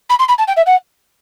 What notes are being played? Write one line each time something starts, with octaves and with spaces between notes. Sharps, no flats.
B5
C6
B5
A5
G5
E5
F#5